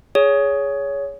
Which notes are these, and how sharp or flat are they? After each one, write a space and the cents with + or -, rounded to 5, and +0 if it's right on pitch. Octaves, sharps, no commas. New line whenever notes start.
G#4 +0 C#5 +20